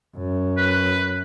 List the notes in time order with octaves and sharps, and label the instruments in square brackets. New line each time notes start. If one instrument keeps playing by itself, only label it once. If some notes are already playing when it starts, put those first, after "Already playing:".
[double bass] F#2
[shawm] B4